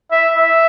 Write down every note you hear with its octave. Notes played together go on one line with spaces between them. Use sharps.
E5
E5